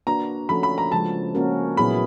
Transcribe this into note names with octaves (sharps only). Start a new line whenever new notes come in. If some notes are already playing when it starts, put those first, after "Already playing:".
A#3 D4 F#4 B4 A#5
F3 A3 C#4 F#4 A4 B5
B5
A#5
C#3 F3 G#3 A5
A#3 C#4 F#4 A#4
A#2 F#3 B3 E4 G#4 B5